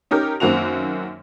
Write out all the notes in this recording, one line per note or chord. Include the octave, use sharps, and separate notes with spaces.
C#4 D#4 G4 A#4
F#2 D#3 A#3 C4 F#4 F7